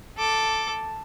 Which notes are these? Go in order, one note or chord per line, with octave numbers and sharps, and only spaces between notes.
A4 D6